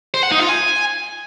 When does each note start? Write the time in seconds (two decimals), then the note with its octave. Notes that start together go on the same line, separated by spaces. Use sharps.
0.14 C5
0.23 F#5
0.32 D#4
0.40 F4
0.49 G#5